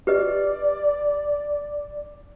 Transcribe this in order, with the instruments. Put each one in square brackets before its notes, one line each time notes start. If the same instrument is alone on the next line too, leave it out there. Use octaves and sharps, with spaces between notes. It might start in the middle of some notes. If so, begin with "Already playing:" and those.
[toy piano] G4 B4 D#5 [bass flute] D5